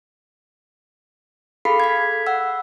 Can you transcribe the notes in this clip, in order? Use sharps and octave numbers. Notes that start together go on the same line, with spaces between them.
G#4 A4 F5 B5 B6 C7
G#6 B6
F#5 E6